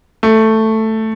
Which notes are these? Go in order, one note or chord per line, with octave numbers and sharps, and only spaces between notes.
A3